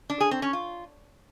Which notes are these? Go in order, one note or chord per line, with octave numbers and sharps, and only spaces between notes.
D4
G#4
C4
C#4
F4